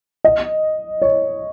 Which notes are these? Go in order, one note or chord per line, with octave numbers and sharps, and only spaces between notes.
D#5
C#5